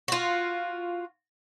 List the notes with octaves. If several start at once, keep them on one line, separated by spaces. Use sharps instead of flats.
F4 F#4